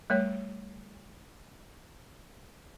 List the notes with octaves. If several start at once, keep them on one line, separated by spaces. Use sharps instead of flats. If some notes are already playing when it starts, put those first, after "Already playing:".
G3 A3 C#5